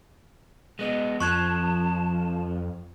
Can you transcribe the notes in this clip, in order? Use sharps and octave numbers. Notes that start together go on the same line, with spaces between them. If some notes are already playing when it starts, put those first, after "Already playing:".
G#3 B3 D#5
F2 F3 A5 C#6 F#6 G#6